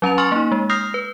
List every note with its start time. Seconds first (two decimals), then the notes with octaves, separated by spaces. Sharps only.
0.02 F#3 C#4 A#5 F7
0.18 G#5 C6 C#6 F6 A6 F#7
0.32 A#3 D#4
0.52 G#3
0.69 D#6 F6 G6 A#6 C7 F7
0.94 B4